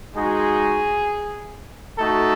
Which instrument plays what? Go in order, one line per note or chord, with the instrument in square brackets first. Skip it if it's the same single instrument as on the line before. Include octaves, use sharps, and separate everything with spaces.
[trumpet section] G#3 D#4 F#4 G#4
A3 D#4 F#4 A4